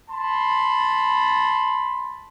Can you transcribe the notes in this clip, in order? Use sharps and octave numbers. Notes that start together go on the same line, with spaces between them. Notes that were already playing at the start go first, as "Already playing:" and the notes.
A5 B5 C6